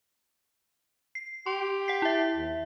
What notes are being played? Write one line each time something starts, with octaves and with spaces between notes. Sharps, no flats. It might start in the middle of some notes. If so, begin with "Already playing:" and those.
C7
G4 C6
F#5 B6 C7
E4 E5
D#2